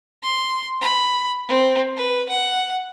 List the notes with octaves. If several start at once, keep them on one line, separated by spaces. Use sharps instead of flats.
C6
B5
C4
B4
F#5